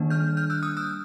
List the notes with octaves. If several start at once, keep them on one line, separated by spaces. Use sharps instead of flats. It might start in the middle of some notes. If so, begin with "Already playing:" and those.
Already playing: D#3 G3 A#3 D4
F6 G6
F6 G6
E6 F#6
D#6 F6
E6 F#6